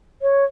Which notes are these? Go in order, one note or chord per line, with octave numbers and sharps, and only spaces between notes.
C#5